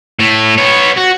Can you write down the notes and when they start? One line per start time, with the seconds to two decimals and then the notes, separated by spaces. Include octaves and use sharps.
0.19 A2 A3
0.58 B3 C#5
0.97 F#4